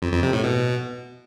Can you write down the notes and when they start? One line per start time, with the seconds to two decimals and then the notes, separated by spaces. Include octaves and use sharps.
0.02 F2
0.12 F2
0.23 C3
0.33 A2
0.44 B2